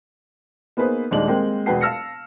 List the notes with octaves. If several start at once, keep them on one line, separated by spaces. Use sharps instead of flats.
A#3 B3 D#4 G#4 B4 C5
D#1 G#3 D4 D#4 D5 F#7
G#3 A#3 C4 A#4 G5
E1 F#4 B4 F#5 G5 C7
F5 A5 E6 F6 A#6 C#7